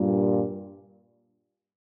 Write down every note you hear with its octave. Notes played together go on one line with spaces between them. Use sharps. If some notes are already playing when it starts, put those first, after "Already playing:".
Already playing: G2 A#2